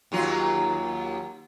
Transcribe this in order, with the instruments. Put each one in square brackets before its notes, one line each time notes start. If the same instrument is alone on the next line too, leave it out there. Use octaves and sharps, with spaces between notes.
[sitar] D#2 F#3 F4